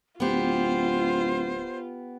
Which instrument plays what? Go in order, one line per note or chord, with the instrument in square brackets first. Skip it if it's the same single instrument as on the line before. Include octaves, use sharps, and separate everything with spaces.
[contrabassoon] D1 [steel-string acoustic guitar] B3 G4 [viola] F4 [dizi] C5